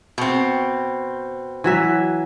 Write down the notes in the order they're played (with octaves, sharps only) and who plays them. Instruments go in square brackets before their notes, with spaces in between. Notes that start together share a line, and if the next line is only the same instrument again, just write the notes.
[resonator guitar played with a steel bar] B2 C4
[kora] E3 F#3 E5